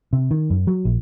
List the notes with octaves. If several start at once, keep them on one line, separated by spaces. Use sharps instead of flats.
C3
D#3
F#2
F#3
A#1